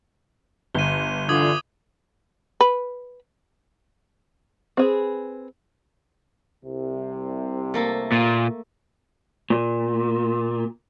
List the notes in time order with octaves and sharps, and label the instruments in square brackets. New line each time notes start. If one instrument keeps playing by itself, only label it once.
[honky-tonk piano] G1 [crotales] D#7 G7
[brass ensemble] D3 E3 F4 [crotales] D6 D#6 G#6
[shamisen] B4
[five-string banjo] C4 G#4 B4
[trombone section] C2 C3
[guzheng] A3 A#3 A4
[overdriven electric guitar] A#2
[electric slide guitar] A#2